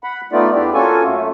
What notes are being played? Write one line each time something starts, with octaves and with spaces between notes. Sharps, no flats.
F#5 B5
A3 B3 D#4 F4 D5
E2 D4 E4 G4 D5
A#3 C#4 F4 F#4 A4 G#5
F#2 A3